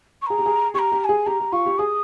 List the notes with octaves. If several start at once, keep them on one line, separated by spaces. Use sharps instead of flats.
C#6
G#4 A#5
G4
G#4
G4 A#5 C#6
G4
A#5
G#4 G#5
G4 A#5
G4
F4 C#6
G4
G#4 D#6